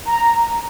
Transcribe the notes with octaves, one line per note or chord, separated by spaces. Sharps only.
A#5